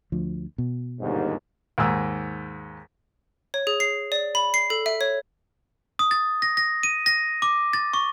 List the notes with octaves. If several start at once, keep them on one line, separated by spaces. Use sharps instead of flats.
D2 F3
B2
G1 D#2 G#2
D#2 G#2 E6
C#5
G#4
C7
D5
B5
C7
A4
E5
C#5
D#6
A6
A#6
A#6
D#7
A#6
D6
A6
C#6